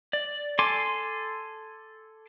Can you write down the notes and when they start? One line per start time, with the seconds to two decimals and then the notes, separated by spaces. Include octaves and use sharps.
0.13 D5
0.59 A4 G#5 C6 D6